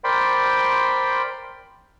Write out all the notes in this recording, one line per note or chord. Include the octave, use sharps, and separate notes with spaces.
A#4 C5 D5 G5 B5 C6